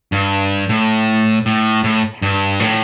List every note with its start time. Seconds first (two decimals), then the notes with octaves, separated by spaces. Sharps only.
0.12 G2
0.69 A2
1.46 A2
1.84 A2
2.22 G2
2.60 A2